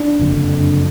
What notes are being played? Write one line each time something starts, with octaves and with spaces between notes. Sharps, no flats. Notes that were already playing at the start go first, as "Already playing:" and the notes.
Already playing: D4
F#1 F2 D3